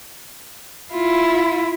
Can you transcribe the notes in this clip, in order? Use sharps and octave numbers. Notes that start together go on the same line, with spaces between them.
E4 F4